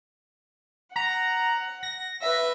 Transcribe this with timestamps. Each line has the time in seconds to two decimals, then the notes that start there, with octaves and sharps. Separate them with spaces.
0.96 F#5 A#5
1.83 A#6
2.22 B4 E5